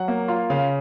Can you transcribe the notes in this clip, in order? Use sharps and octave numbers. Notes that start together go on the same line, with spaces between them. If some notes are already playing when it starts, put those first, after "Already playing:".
Already playing: F#3 F#5
A#3
F4
C#3 F5